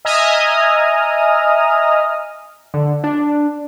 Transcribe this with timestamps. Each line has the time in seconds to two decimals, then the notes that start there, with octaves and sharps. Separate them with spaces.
0.05 D#5 E5 G#5 A#5 D#6 F6
2.74 D3
3.04 D4